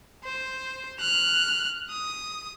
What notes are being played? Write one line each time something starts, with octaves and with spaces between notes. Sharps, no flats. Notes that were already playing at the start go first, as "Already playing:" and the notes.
C5
F6 F#6
D#6